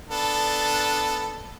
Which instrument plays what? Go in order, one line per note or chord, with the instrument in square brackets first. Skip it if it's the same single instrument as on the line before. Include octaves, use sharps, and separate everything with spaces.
[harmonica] B3 D4 A4